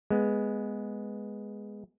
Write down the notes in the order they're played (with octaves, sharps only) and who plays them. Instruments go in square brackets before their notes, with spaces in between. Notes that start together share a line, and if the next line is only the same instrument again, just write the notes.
[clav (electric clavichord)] G#3 B3